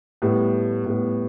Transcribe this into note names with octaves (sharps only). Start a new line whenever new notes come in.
A2 G3 B3
A2 G3 B3